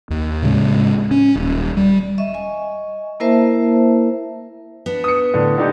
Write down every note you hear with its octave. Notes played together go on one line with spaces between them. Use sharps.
D#2
A2 C#3 G#3
C#4
D#1
G3
D#5 E5 C#6
D#5 G#5 C#6
A#3 E4 A#4 C5 E5 A5
B3 D4
D#6 C#7
A2 D3
D3 D#4 G4